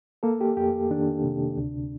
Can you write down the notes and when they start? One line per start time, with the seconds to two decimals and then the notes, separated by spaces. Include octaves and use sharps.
0.23 A#3 A4
0.41 G4
0.57 F2 G4
0.90 D#3 D4
1.24 C3
1.57 D2